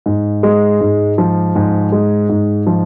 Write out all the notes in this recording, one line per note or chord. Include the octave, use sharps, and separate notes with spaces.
G#2
G#3
G#2
F3
G#2
G#3
G#2
F3